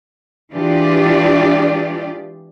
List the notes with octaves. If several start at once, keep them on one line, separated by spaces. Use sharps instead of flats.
E3 G#3 D4 F4 G4 D5